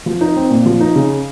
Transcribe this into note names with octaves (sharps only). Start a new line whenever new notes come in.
F3
D#4
C4
A#2
F3
D#4
C#3